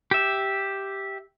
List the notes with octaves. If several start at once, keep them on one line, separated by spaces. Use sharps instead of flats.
G4 E5